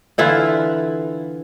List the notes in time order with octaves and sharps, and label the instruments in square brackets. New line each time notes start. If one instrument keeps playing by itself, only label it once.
[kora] D3 E3 E4 F4